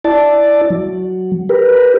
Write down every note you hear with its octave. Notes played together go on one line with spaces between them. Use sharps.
E4 D5 A5
F#3
G4 A#4 B4